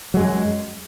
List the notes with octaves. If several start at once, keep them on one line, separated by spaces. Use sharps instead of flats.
F#2 F#3 G#3